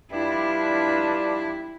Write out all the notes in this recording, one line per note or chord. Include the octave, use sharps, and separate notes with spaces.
G3 B3 D4 E4 F4